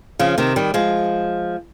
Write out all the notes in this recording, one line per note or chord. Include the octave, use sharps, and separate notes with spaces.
C#3 F3
C3 D#3
D#3 G3
F3 G#3